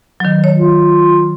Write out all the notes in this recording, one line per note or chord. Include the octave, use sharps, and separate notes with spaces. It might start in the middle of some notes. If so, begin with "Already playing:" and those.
D#3 F#3
C#5
F4